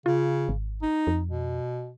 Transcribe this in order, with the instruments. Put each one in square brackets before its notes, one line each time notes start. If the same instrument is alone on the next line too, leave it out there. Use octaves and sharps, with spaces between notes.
[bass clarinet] C#3 [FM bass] F4
[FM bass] G#1
[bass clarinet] D#4
[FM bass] F2
[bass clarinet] B2